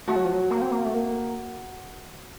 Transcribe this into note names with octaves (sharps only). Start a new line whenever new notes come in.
A3 F#4
F#3
F3
F#3
A#3
C4
A#3
A3
A#3